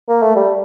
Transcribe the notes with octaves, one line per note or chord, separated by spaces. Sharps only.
A#3
A3
G3